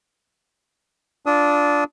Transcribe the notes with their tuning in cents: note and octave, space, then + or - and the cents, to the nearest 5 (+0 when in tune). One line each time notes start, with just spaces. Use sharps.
D4 -10 F4 +0 D#6 +25